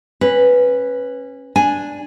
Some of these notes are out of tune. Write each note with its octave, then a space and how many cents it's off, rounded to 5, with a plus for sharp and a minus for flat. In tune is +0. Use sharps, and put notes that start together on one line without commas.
C#4 -20 B4 +0
D4 +0 G#5 +0